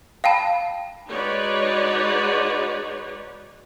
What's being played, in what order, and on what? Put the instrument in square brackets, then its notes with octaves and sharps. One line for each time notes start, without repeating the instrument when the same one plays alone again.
[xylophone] F5 G5 A5 B5
[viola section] G#3 D#4 F#4 B4 C#5 D5